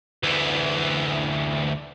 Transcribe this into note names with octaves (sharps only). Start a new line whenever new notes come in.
D2 E3